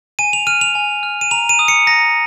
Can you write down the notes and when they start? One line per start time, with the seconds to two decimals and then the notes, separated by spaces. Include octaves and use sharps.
0.19 G#5 D#7
0.33 F7
0.47 F6 D#7
0.61 F7
0.75 G#5
1.03 F6
1.21 D#7
1.31 A#5 F7
1.49 D#7
1.59 D#6
1.68 C#7
1.87 A#5 A#6